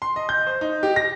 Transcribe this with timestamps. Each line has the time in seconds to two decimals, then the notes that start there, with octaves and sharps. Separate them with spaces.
0.02 C6
0.16 D#5
0.29 G6
0.47 C5
0.61 D#4
0.83 G4
0.96 A#6